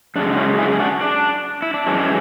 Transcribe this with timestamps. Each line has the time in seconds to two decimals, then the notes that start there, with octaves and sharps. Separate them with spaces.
0.16 F#2 C#3 G#3 D4
0.33 F#4
0.37 C#4 E4
0.58 E4 G#4
0.72 G#4
0.79 D4 F#4
1.01 D4
1.62 E4
1.74 D4
1.86 F#2 E3 G#3 C#4